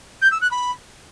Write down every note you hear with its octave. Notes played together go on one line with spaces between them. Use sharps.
G6
E6
F#6
B5